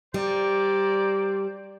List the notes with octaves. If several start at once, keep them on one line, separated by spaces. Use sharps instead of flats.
G3 C5 D5 A#5